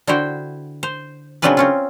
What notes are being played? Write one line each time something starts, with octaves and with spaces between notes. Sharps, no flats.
D3 E4 F#4 C5 G5
C5
C#3 F#3 C4 D4 F4 B4
C4 C#4 F4